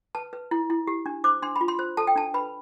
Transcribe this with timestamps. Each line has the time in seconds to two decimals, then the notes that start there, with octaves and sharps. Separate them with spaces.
0.15 B4 A5
0.33 B4
0.51 E4
0.70 E4
0.87 G4
1.06 D4
1.24 C5 D6
1.42 D4 C6
1.56 B5
1.61 F4
1.68 C6
1.79 C5
1.97 A4 A5
2.07 G5
2.16 D4 A5
2.34 B4 B5